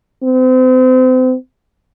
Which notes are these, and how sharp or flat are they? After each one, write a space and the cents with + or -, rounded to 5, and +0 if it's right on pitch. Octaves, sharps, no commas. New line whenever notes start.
C4 -35